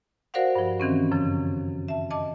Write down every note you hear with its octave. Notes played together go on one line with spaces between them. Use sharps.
F#4 A#4 C5 D5 F5 F#5
G2 F3
D#3 E3 C4 C#4
F#2 C#3 F3
E5 A5
D#5 A5 D6